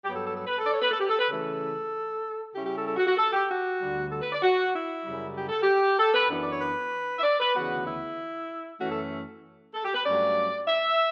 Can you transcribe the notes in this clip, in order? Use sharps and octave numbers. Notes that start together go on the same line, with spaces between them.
G2 F#3 B3 G4
A4
A4
A4
B4
A4
D5
C#5
B4
A4
G4
A4
B4
C#3 E3 A3 C#4 A4
C#3 G3 C#4 E4 G4
G4
A4
A4
F#4
F#4
A4
G4
F#4
D2 D3 G3
A4
B4
D5
F#4
E4
F#2 C#3 G3
G4
A4
G4
A4
B4
F#2 E3 B3 D4
D5
C#5
B4
E5
D5
B4
D2 C#3 E3 B3 F#4
E4
F#2 E3 A3 C#4 F#4
A4
A4
G4
B4
G2 F#3 A3 C#4 D5
E5